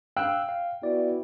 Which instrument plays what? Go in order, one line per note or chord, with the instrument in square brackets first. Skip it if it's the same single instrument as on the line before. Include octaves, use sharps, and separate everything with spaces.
[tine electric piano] F5 E6 F#6 [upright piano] G5
[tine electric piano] F5
[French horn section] B3 E4 F#4 [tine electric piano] D5